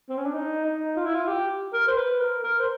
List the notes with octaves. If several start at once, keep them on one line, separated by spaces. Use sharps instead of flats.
C4
C#4
D4
D#4
D#4
F4
E4
F4
G4
A#4
C5
B4
A#4
A#4
C5